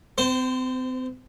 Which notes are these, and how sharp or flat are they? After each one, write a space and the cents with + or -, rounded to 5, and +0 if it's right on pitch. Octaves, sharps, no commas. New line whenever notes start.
C4 -35 C5 +0